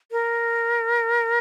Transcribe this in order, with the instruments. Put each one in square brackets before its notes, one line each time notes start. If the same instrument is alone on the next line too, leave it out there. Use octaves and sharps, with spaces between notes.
[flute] A#4